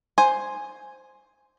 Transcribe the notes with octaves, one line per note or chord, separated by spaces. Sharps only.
C5 G#5